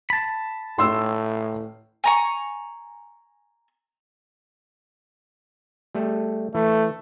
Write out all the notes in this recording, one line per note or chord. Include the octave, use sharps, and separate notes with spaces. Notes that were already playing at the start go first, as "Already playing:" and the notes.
A5 B5
A2 C6 E6
G#5 A#5 C#6
G3 A3 A4
E3 A3